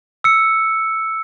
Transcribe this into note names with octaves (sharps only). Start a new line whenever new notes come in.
E6 C#7